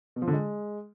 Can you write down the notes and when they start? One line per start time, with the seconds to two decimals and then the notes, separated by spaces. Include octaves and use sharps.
0.16 B2
0.22 F3
0.28 D3
0.33 G#3